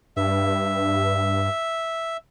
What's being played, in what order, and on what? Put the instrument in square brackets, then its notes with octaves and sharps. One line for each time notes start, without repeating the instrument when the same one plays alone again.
[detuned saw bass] G2 [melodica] E5